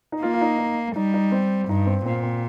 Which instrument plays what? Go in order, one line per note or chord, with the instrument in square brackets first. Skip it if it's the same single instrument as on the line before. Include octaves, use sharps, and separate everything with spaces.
[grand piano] D#4
[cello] A#3 [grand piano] F4
[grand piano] F4
D#4
D#4
[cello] G3 [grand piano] D#4
[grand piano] D#4
C4
[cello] G2 [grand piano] D#4
[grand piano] C4
[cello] A#2 [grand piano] C4
[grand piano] C4